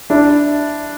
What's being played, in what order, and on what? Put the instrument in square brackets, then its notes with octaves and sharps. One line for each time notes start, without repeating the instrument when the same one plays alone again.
[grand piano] D4 E4